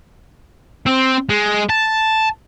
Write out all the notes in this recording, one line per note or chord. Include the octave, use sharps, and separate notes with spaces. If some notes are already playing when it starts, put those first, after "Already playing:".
C4
G#3
A5